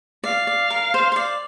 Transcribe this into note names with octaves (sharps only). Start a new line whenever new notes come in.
D5 F5
D5
A#4
C5
C5
D5